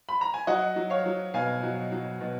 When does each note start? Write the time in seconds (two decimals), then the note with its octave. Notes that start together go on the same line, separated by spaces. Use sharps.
0.09 B5
0.21 A#5
0.34 G#5
0.47 F#3 D#5 F#5
0.76 F#3
0.90 C#5 F5
1.06 F#3
1.34 B2 F5 G#5
1.63 F#3
1.92 F#3
2.21 B2